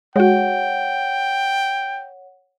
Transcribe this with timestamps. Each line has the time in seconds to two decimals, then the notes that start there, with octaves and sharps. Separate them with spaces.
0.16 G#3 F#4 C#5 F#5 G5